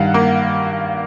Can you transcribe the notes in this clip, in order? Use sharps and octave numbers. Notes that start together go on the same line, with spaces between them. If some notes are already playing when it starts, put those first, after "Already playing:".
Already playing: G2 D#3 F5 F#5
A#3